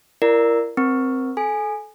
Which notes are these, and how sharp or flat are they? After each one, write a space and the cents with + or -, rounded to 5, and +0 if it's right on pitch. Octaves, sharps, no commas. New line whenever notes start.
E4 +40 A#4 +0 D5 +0
C4 +0 A#4 +20
A4 -25 G#5 +0